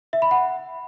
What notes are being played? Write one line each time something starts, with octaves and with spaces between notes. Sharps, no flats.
E5
B5
F#5